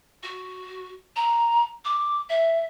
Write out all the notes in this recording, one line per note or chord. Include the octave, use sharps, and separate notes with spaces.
F#4
A#5
D6
E5